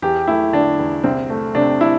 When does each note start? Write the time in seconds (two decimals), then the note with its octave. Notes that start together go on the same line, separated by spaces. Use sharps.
0.02 E2 G4
0.27 A3 E4
0.53 D3 D4
0.79 E2
1.04 C2 C4
1.30 A3
1.55 C3 D4
1.81 E4